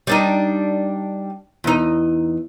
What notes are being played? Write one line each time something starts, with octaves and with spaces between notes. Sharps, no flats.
G3 D4 D#4
E2 D#4